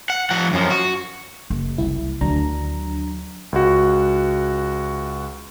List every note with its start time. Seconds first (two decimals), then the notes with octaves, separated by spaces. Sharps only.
0.10 F#5
0.30 F3 F#5
0.53 F#2 F3
0.70 F#4
1.50 F#1
1.78 C2 E4
2.21 D2 D#3 F#3 D4 A#5
3.53 C#2 F#4